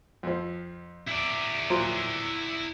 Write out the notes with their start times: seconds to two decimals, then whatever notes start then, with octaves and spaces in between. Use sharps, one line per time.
0.23 F2 F3
1.07 E4 D5
1.70 A#2 F3 F#3